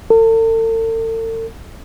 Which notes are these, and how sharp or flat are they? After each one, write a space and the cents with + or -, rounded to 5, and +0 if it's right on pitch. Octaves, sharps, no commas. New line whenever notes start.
A4 +40